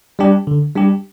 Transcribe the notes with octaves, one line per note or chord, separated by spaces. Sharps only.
G3 D4 G4
D3
G3 D4 G4